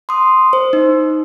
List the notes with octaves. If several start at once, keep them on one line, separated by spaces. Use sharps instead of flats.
C6 D#6
C5
D#4